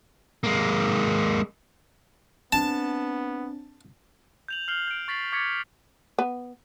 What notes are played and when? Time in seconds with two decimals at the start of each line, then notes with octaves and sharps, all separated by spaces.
0.44 G#3 A#3
2.53 B3 C4 D4 A5
4.48 G6 F7 F#7
4.68 F6 G6 C7 F#7 G7
4.88 G6 D7
5.08 C#6 A6 B6 C7 F#7
5.32 C#6 D6 G#6 A6 B6 C#7
6.19 B3